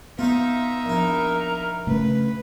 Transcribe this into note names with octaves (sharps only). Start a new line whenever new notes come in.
B3 D#4 F4 C5 E5
A#1 E4 A#4
C#3 A3 C#4 B4